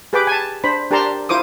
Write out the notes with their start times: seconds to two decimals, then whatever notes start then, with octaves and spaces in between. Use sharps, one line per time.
0.13 G4 G#4 B4 G5 B5 D6
0.27 G#5 A5
0.64 D4 C5 B5
0.91 D4 G4 A#4 A5 A#5 C6
1.29 E4 F4 C5 D6 D#6